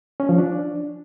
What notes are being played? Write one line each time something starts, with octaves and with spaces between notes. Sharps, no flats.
C#4
F3
D4